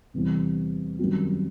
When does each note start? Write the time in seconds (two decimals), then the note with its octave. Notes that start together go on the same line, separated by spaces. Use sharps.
0.14 E2 C3 E3 G3 C4
0.99 F#2 D#3 G3 C4 F#4